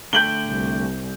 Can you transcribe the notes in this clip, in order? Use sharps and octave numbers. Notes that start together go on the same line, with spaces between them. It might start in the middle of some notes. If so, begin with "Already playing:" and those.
D3 A3 G5 G6 F#7 G7
C2